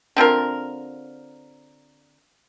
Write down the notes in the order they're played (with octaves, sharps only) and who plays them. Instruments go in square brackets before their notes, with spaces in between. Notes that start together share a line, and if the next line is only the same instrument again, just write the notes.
[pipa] D3 C4 F4 A#4